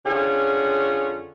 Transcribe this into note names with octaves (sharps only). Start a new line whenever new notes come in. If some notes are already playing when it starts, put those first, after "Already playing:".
F2 D3 C#4 F4 G#4